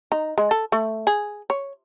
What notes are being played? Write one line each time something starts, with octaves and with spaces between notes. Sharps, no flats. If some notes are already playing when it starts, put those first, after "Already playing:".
D#4
G#3
A4
A3
G#4
C#5